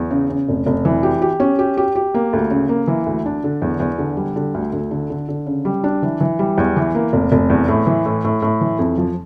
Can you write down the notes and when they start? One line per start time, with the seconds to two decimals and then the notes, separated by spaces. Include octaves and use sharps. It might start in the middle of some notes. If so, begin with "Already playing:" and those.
Already playing: E2
0.10 C#3
0.30 C#3
0.49 F1
0.66 F1
0.85 E3
1.03 G4
1.22 G4
1.40 C#4
1.59 G4
1.77 G4
1.96 G4
2.15 A#3
2.33 D2
2.51 C#3
2.69 A#3
2.88 E3
3.06 D2
3.26 D4
3.44 D3
3.62 E2
3.80 E2
3.99 D3
4.17 G3
4.36 D3
4.54 D2
4.72 D2
4.91 D3
5.10 D3
5.29 D3
5.46 C#3
5.65 G3
5.84 D4
6.02 E3
6.21 E3
6.39 G3
6.58 E2
6.76 E3
6.95 A#3
7.13 F1
7.32 F1
7.50 E2
7.68 A2
7.87 E3
8.06 A2
8.24 A2
8.42 A2
8.61 E3
8.79 F2
8.98 F3